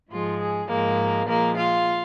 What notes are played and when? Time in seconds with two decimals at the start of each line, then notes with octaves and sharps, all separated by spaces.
0.11 G#2 F3 G#3 F4
0.39 G#4
0.69 G#2 F3 G#3 A#3 A#4
1.27 A#2 F3 G#3 A#3 A#4
1.57 F4 F5